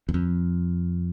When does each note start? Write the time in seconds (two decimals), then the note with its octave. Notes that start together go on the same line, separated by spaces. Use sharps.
0.09 E2
0.14 F2